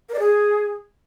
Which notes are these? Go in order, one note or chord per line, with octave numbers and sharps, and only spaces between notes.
A#4
D5
G#4